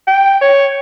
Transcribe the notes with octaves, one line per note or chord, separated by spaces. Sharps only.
G5
C#5